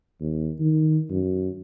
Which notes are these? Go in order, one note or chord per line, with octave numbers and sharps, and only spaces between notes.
D#2
D#3
F#2